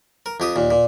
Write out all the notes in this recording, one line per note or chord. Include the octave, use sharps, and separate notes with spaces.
A#4
F2 G4 D#6
D#2 A#2
A#2